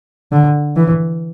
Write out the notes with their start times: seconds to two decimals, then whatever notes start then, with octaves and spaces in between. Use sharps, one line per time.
0.32 D3
0.77 E3